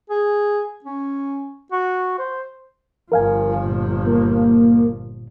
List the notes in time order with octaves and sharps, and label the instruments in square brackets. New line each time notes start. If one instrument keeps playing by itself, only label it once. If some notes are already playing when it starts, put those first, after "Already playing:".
[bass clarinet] G#4
C#4
F#4
C5
[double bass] G1 F3 [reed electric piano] A#4 F5 G#5
[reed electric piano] A#2
[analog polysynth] A#3